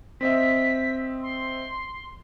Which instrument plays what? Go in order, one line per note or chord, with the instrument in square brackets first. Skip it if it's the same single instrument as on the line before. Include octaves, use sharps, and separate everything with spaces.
[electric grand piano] C4 D#5 E5 [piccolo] B6
[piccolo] C6